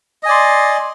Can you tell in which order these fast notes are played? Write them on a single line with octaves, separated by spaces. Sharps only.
D#5 G#5 D5 C6